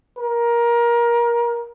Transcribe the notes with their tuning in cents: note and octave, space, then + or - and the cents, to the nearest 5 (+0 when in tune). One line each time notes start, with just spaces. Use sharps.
A#4 +20